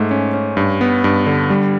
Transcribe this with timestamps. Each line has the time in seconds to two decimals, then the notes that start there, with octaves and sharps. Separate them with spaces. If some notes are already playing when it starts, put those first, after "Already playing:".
Already playing: G#2 A3
0.11 C#4
0.34 C#4
0.57 G2
0.81 B3
1.04 G2
1.26 D3
1.50 G3